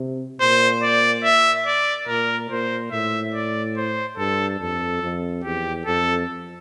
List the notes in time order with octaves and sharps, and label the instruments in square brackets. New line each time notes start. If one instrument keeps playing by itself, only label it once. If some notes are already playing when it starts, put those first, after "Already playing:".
Already playing: [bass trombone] C3
[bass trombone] A#2 [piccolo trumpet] C5
[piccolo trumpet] D5
E5
D5
[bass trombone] A#2 [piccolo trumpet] A#4
[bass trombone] A#2 [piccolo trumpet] C5
[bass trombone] A2 [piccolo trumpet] E5
[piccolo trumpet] D5
C5
[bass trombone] G2 [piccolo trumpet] A4
[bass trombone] F2 [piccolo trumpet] A4
[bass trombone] F2
[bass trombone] E2 [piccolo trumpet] G4
[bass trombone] F2 [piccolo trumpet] A4